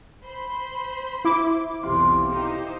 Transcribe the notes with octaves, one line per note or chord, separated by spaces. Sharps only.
C5 B5 C6
E4 D6
B1 E2 C3 F4
D#4 G4 C5